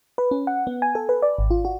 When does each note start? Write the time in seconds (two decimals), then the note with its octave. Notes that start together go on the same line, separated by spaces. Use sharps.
0.18 B4
0.31 C#4
0.47 F#5
0.67 B3
0.82 G#5
0.95 A4
1.09 B4
1.22 D5
1.38 G#1
1.50 F4
1.65 F#4